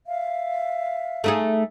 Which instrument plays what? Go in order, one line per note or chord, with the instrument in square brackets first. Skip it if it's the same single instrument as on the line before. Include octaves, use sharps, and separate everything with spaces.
[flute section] E5 F5
[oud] A3 D#4 G#4